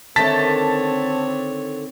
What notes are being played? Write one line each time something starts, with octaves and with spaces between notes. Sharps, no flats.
D3 D#3 A3 C4 C#5 A5 A6 B6